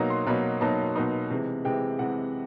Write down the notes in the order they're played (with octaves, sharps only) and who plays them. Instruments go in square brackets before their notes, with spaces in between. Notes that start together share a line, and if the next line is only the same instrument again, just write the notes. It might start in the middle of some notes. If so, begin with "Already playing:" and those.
Already playing: [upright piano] B2 F#3 A#3 D#4 A#5
C6
B2 F#3 A#3 D#4 B5
B2 F#3 A#3 D#4 A5
B2 F#3 A#3 D#4
C3 E3 G#3
C3 E3 G#3 G5
C3 E3 G#3 F#5